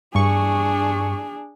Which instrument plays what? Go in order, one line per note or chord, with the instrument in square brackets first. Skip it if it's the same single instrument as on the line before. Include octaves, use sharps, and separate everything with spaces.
[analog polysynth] G2 C#6 [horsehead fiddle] D4 G#4